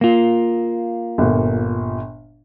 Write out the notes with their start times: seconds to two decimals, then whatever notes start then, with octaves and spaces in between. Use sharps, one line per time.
0.01 A#3 F4
1.18 G1 A#2